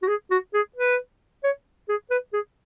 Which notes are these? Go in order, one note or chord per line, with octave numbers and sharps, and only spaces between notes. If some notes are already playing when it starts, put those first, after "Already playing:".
F#4
G#4
F#4
G#4
B4
C#5
G#4
B4
G#4